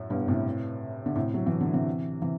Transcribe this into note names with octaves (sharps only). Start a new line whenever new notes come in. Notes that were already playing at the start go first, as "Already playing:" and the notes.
Already playing: F#2 A2
G2 B2
A2 C3
D3
A2 C3
F#3
E3
D3
C3 E3
C3 E3